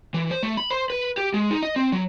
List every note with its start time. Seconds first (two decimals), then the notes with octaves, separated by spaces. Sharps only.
0.14 E3
0.31 C5
0.43 A3
0.57 B5
0.70 C5
0.90 B4
1.17 G4
1.34 G#3
1.51 D#4
1.63 D#5
1.76 C4
1.92 F#3